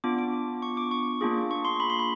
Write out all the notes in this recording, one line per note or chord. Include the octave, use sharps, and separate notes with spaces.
B3 D4 F4 D6
D6
C#6
D6
C#6
A#3 D4 F4 G#4
C#6
C6
B5
C6
B5